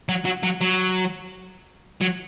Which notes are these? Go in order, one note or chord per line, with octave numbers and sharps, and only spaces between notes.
F#3
F#3
F#3
F#3
F#3